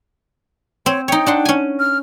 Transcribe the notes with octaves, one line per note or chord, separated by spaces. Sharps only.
C4 C#5
D#4 C#5 G5
D4 F#5 C6
C#4 G#5
F6